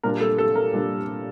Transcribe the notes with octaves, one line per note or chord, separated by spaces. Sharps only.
A#2 G3 D4 A#4
A4
A4
A#4
A#2 G3 D4